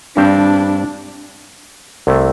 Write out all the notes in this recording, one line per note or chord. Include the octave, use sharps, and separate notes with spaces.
G2 G3 C4 D4 G4 C5
C2 C3 A3